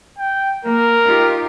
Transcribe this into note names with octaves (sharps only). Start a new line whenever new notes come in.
G5
A#3 A#4
D#4 F4 G4